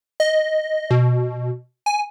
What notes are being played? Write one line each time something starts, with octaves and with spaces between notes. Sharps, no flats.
D#5
B2
G#5